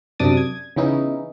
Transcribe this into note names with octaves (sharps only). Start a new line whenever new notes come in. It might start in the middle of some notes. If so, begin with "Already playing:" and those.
F#2 C3 D4 D6 D#6 A6
G#6
C#3 E3 B3 C#4 D#4 E4